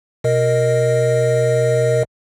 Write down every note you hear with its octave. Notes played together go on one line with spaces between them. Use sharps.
B2 A#4 D#5